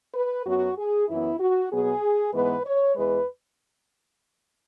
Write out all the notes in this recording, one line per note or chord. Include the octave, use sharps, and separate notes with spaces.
B4
F#2 F#3 B3 F#4
G#4
F#2 E3 B3 E4
F#4
B2 F#3 B3 G#4
G#2 E3 G#3 B3 B4
C#5
E2 E3 G#3 B4